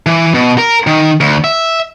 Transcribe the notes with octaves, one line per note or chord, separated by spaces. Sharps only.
E3
B2
A#4
D#3
D2
E5